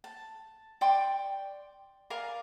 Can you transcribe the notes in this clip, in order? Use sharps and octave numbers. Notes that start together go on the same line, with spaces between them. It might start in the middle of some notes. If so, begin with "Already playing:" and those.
A5
D5 G5 C6 C#6
A#4 D5 F5 G#5